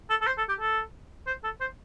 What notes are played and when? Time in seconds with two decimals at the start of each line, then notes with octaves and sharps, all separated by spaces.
0.10 A4
0.21 A4
0.27 C5
0.38 A4
0.49 G4
0.60 A4
1.27 C5
1.44 A4
1.61 C5